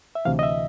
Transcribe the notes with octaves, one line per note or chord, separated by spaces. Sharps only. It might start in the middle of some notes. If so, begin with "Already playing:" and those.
E5
D2 C3 E3 F5
D#5
E5